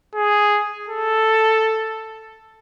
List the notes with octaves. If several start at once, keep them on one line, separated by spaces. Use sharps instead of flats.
G#4
A4